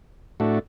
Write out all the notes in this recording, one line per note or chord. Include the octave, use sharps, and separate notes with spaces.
A2 A3 D4 F#4